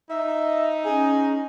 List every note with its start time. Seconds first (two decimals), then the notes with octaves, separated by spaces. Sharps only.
0.10 D#4 E5
0.85 C#4 G#4